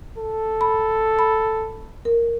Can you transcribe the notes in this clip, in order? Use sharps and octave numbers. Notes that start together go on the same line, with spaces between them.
A4
B5
B5
A#4